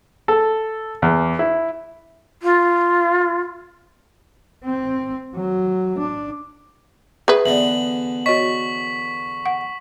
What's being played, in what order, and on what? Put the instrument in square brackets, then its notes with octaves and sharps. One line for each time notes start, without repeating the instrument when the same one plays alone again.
[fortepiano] A4
E2
E4
[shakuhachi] F4
[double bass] C4
F#3
D4
[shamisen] G#4 B4 [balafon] E5
[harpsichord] E2 D3 B3 [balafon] D5 E5 [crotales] F#7
[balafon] F#4 C#5 D#5 [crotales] C#6 B6
[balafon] F#5